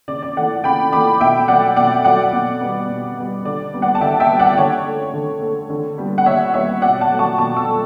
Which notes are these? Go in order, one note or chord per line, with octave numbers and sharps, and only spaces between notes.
C#3 D5
D5
E3 A3 D5 F#5
C#3 G5 B5
E3 A3 B5 D6
B2 E5 G5
F#3 A3 D5 F#5
B2 D5 F#5
F#3 A3 D5 F#5
B2
G3 B3
B2
G3 B3
D3 D5
G3 B3
D5 F#5
A5
D3 E5 G5
E5 G5
G3 B3
D5 F#5
D3 C#5
A3
D3
A3
D3
G3 B3
F#5
D3 C#5 E5
G3 B3 C#5 E5
B2 D5 F#5
F#5 A5
F#3 A3
A5 C#6
B2 A5 C#6
C#6 E6
F#3 A3